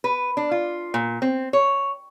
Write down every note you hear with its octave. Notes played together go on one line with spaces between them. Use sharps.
B4
D4
F4
A#2
C4
C#5